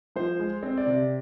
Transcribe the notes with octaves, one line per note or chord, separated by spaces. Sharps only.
F3 C5
G#3
C4
D5
C3